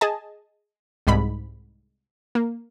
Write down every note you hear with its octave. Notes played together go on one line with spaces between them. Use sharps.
G#4 D#5 G#5 A5
C2 G#2 B5
A#3